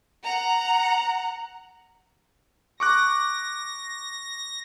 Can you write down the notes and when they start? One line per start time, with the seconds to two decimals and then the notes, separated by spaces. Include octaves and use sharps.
0.24 F#5 A#5
2.80 C#6 D6 F#6 A#6